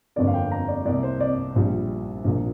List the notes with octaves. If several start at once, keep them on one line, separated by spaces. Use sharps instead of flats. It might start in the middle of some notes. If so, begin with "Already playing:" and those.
G1 F2 D3 A#3 D5
F5
G5
A#5
D5
C2 C3 A#3 D5
C5
D5
A#1 A#2 G3
A#1 A#2 A#3